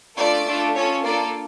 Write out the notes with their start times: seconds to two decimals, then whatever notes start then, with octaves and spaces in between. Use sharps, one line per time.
0.17 A3 D4 F4 A4 D5
0.46 A3 D4 F4 A4
0.75 C#4 F4 A4 C#5
1.04 A#3 D4 F4 A4 D5